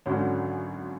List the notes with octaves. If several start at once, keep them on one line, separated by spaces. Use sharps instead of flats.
G#1 F#2 D3 F#3 C#4